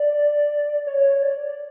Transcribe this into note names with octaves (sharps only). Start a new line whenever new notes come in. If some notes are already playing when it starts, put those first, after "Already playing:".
Already playing: D5
C#5
D5